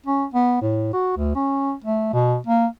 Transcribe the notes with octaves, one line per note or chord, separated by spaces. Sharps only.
C#4
B3
A2
F#4
D2
C#4
A3
B2
A#3